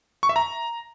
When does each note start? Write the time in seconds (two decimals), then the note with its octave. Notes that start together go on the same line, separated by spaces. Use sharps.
0.23 C#6
0.29 E5
0.36 A#5